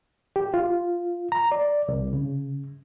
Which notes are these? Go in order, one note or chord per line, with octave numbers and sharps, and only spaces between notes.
G4
F4
A#5
D5
C2
C#3